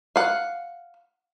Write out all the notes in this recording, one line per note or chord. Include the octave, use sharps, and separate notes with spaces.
F5 F#5